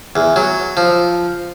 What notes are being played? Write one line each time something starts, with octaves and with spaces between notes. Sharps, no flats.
E2
F#3
F3